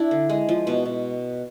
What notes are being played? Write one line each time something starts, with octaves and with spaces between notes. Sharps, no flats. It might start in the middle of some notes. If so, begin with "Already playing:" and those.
Already playing: D4 E4
D3
G#3
F3
B2
B2